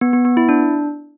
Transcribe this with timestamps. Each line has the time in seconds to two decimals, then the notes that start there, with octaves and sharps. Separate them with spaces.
0.01 B3
0.13 B3
0.25 B3
0.37 E4
0.49 D4